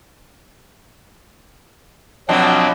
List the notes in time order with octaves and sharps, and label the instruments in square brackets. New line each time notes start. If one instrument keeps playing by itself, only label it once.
[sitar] B2 F3 D4 [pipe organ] F#3 C4